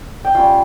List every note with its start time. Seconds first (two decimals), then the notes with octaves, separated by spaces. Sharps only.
0.25 G5
0.35 G3 C#4 F4 F5